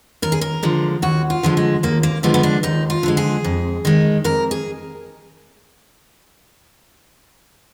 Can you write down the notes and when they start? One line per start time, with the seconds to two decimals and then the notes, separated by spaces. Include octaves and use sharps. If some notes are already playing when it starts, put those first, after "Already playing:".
0.22 D#2 A#4
0.32 G#4
0.41 A#4
0.63 D3 F3 G#3
1.02 D#2 F#4
1.30 F4
1.43 D3 F3 G#3
1.57 G#3
1.83 D#2 A#3
2.03 A#3
2.23 D3 F3 G#3 B3
2.34 B3
2.43 D4
2.63 D#2 D#4
2.90 F4
3.03 D3 F3 G#3
3.17 G#4
3.44 F2
3.85 D#3 G#3
4.24 F2 A#4
4.51 G#4